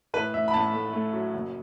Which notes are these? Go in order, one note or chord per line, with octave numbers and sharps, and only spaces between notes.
A2 B4
A2 E5
B5
A2 A5
A3
A3
F#3
F#1